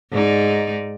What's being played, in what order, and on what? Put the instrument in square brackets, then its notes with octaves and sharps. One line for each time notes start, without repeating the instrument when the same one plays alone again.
[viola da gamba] G#2 D#4 D5